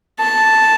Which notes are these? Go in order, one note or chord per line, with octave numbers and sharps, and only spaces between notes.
A5